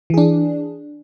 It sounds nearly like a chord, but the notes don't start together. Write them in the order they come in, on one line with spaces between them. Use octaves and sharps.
E3 G#4 D4